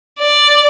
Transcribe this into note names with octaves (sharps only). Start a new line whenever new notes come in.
D5